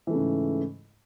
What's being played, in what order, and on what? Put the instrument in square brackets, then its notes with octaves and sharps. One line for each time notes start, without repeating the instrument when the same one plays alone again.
[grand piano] E3
A3
C#3
G#2